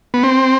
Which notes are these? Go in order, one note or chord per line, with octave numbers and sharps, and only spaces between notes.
B3
C4